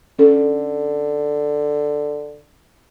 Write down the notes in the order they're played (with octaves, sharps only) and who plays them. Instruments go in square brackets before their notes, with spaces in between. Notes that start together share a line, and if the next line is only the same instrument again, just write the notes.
[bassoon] D3 [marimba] C#4 A4